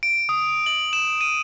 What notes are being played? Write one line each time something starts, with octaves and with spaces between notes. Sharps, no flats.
D7
D#6
F#7
E7
D#7